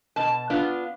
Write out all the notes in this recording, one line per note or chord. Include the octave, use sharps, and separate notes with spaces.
B2 A5
B3 D4 F4